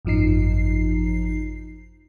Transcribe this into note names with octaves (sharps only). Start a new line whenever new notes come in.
G#1 F#2 F3 D#4 C7